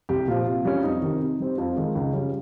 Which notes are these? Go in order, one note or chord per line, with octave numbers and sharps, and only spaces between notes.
C2 G4
A#2 F3 F4
C3
G3 C#4
F2 D#4
C3 D#3
C3
G3 C4
F2 F4
D#3 G#3
C#2
C#3 G3 C#4